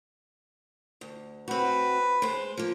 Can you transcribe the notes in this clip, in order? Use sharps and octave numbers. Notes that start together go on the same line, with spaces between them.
D2
C4 F#4 B4
G#3 C5
F3 A#3